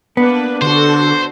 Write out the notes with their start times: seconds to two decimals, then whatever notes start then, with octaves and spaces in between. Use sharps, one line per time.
0.17 A#3 B3 D4 B4
0.62 D3 D4 F#4 A4 C5